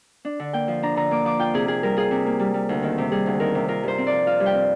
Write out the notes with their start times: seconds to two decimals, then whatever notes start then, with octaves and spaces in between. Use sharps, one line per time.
0.25 D4
0.40 D3
0.53 A#3 G5
0.68 F3
0.83 D4 A#5
0.96 D3 A#5
1.11 A#3 D6
1.25 F3 D6
1.39 F4 G5
1.54 C3 G#4
1.68 A#3 G#4
1.83 G3 A#4
1.97 F4 G#4
2.11 C3
2.26 A#3
2.39 G3
2.54 G3
2.69 D2
2.83 D#3
2.98 C3
3.12 G3 G#4
3.26 D2
3.40 D#3 A#4
3.54 C3
3.68 F4 A#4
3.83 G2 C5
3.98 C4
4.07 D5
4.12 F3
4.26 F4 F5
4.40 G2
4.46 G5
4.54 C4